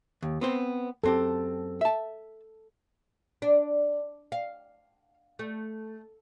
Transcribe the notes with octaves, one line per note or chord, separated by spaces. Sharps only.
D#2
B3 C4 C5
F#2 C4 G4 A4
E5 A5
D4
F5
A3